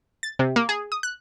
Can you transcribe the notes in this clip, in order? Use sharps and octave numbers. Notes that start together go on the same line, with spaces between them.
A6
C3
A#3
G#4
D#6
F#6